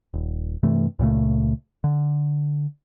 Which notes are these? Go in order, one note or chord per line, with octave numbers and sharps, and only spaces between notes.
D#1
G2 C3 E3 A3
C#2 A#2 C#3 A3
D3